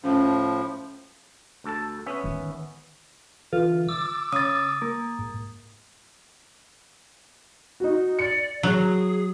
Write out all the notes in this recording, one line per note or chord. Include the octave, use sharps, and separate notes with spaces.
A2 F3 C#4
D2 A4 A5
B3 C#4 E5
D#3
D3 E3 F4
D6 E6 A6
C#3 D#6 A6
A#3
G#2
D#4 F#4
D5 C#7
F#3 G#4